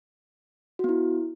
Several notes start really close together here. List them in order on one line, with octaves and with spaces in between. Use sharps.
F#4 B3 E4